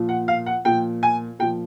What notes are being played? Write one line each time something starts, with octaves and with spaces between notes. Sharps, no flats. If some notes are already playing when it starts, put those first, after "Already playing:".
Already playing: A#2 F3
F#5
F5
F#5
A#2 F3 G5
G#5
A#2 F3 G5